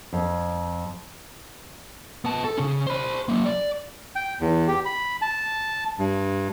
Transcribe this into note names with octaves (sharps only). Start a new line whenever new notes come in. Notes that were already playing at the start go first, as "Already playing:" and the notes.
F2
B3 A5
A4
C#3 C#4
C5 B5
F#3 A#3
D5
G5
E2
G4
B5
A5
G2